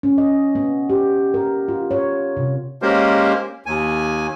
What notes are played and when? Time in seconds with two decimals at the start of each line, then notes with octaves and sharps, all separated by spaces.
0.03 C#4
0.18 D#5
0.55 B3
0.90 G4
1.34 A#4
1.68 F4
1.91 C#5
2.37 C3
2.82 G#3 A#3 C#4 G4 A#4 C5
3.66 D#2 G#5